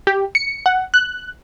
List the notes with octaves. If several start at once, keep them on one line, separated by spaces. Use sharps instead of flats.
G4
C#7
F#5
F#6